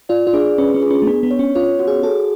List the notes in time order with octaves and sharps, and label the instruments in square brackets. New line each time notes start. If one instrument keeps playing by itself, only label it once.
[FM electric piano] F4 [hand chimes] D5
[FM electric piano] F4
[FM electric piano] D4 [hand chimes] G#4
[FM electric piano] C#4 [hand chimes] B4
[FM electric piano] C#4
[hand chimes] G#4
[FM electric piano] C#4
A3
[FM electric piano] B3 [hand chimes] D4
[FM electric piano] B3
[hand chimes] C#5
[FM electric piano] C#4
[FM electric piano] F4 [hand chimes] C#5
[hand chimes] F#4
[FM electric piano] G#4
[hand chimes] G#4 [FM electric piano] A4